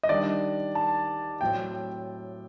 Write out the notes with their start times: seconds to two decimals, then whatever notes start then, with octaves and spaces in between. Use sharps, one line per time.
0.03 D#5
0.09 D#3 G3 D4 D5
0.75 A5
1.41 A2 F#3 C4 G5